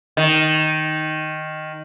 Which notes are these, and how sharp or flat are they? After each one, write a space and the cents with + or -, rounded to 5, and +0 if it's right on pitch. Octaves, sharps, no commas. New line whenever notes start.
D#3 +0